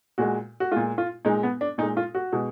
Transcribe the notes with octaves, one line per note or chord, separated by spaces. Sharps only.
A#2 G#3 F#4
F#4
A#2 G#3 F4
F4
A#2 G#3 D#4
B3
D4
A#2 G#3 D#4
F4
F#4
B2 G#3